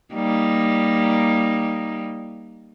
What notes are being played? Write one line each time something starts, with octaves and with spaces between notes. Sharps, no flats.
G3 A#3 D#4